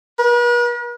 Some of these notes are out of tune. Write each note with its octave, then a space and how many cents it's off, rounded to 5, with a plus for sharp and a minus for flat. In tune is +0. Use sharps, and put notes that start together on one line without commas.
B4 -45